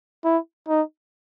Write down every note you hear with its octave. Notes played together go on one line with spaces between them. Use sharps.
E4
D#4